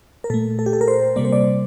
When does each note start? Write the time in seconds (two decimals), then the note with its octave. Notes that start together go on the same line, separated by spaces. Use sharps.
0.24 A#4
0.30 A#2 A3 A4
0.59 A4
0.66 G4
0.73 A4
0.81 A#4
0.88 C5
1.16 C3 G3 A#3 D5
1.25 C5
1.32 D5